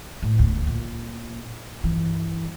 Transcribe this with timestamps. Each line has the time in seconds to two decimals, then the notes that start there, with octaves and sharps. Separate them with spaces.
0.23 A2
0.38 E1 D2
0.67 A#2
1.84 G2 E3